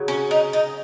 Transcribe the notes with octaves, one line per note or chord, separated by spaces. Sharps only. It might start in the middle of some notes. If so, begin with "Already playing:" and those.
Already playing: C#3 F#3
C#4
D#4
D#4